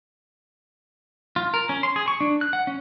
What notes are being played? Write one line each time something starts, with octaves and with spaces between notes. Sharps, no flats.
F4
A#4
C#4
C6
G#4
C#6
D4
F#6
F#5
C#4